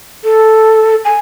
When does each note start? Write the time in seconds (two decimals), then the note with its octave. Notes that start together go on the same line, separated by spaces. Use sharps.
0.24 A4
1.05 G#5